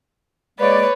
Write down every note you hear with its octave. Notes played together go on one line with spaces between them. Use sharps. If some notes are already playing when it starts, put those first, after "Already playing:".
G#3 A#3 B4 C#5 D5